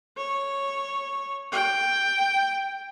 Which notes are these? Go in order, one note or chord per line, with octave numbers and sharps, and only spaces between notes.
C#5
G5